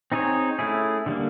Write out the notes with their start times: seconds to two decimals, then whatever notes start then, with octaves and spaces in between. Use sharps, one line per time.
0.12 C4 D#4 G#4 C#5
0.59 A3 C#4 E4 G#4
1.06 D3 G3 A#3